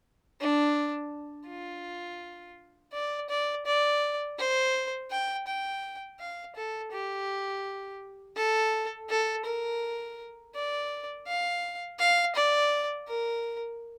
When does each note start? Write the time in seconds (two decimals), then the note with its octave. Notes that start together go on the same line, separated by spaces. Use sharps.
0.40 D4
1.48 F4
2.94 D5
3.29 D5
3.66 D5
4.38 C5
5.11 G5
5.47 G5
6.19 F5
6.55 A4
6.92 G4
8.36 A4
9.10 A4
9.45 A#4
10.55 D5
11.27 F5
11.99 F5
12.35 D5
13.08 A#4